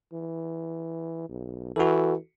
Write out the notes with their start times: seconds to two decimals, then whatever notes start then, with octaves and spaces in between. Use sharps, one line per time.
0.13 E3
1.29 B1
1.76 E3 F#4 A4